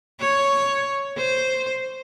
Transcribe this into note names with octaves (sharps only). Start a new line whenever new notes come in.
C#5
C5